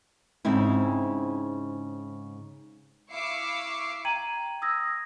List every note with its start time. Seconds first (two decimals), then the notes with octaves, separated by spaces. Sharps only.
0.45 G#2 C#3 C4 E4
3.11 E4 E5 F5 C#6 D6 C7
4.05 G5 A#5 G#6 D#7 F#7
4.62 D#6 E6 G#6 A#6